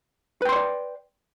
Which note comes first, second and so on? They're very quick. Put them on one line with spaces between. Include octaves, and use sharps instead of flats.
B4 G5 C6 C#5 D5